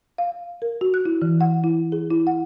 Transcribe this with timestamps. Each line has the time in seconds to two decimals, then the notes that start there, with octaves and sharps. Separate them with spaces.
0.18 F5
0.62 A#4
0.81 F#4
0.94 F#6
1.06 E4
1.22 E3
1.41 F#5
1.64 E4
1.92 G#4
2.11 E4
2.27 F#5